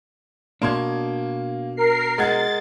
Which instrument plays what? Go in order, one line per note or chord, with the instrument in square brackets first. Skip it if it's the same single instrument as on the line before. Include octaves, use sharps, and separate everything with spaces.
[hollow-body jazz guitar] B2 D4 [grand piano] A#3 C6 G#6
[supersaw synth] A#4 C7
[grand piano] G#3 F#5 G#6 [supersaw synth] A6